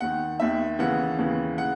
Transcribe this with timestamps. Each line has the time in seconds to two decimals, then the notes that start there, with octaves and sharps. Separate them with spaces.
0.01 D#2 D#3 F#5
0.40 D#2 D#3 E5
0.79 D#2 C#3 E3 F#5
1.18 D#2 C#3 E3
1.58 C#3 F#5